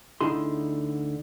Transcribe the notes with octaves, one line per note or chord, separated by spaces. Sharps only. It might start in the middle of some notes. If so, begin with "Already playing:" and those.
D2 D3 D#4 E4 G#4 C6